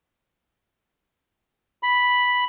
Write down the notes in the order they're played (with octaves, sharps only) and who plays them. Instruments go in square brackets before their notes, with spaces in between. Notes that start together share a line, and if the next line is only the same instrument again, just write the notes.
[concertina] B5